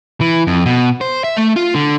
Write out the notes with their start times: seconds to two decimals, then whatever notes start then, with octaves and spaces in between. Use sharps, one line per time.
0.21 E3
0.47 F2
0.66 B2
1.01 C5
1.24 E5
1.37 A3
1.56 F4
1.75 D3